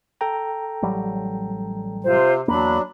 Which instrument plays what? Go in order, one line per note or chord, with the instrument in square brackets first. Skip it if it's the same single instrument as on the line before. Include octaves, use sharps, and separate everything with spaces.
[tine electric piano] A4 G5 A#5
[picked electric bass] A1 F#3 G3
[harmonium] C3 [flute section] F4 C5
[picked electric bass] E2 A#3 [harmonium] F#3 D4 [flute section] B5